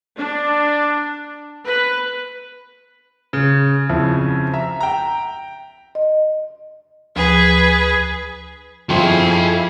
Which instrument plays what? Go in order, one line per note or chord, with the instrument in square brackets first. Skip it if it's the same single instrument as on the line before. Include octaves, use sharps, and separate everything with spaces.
[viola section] D4
B4
[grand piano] C#3
F2 C#3 F3 E4
E5 A#5
G5 A#5
[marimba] D#5
[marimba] D2 F3 [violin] G#4 B4
[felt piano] F2 F3 C6 [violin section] E4 G#4 F5 [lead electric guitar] A4 G5